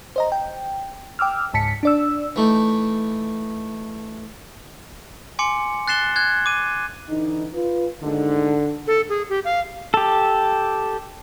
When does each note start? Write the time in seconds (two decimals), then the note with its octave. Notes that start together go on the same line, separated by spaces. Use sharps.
0.16 C5 D#5 A#5
0.32 G5
1.19 G5 D6 E6 F6
1.53 C#2 G#2 A5 B6 C#7
1.83 D4 D5 E6
2.36 E3 A3 D#4
5.39 G#5 C6 D6 C#7
5.88 F#6 A6 C7 E7 G7
6.16 F#6 G#6
6.46 D6 D#7
7.09 D3 E3 D#4
7.54 F4 B4
8.02 D#2 G#2 D3 D#4
8.87 A4
9.09 G#4
9.29 G4
9.45 F5
9.94 G4 A4